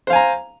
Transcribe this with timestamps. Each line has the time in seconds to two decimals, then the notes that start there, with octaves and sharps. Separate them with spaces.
0.07 C5
0.10 F5
0.13 G#5
0.16 A#5